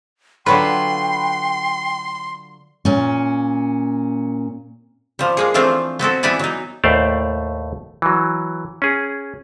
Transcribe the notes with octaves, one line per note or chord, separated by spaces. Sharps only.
D3 F#3 F4 B4 G5 C6
A#2 C#4
F3 G3
G#3 A#3 G#4
E3 F3 A3 C4 D4 F4
B3 C4 F#4 A4
E3 G3 B3 E4 D5 G#5
F#3 D#4
D#2 A2 A3 C5 D5 F5
E3 F#3
C#4 G#4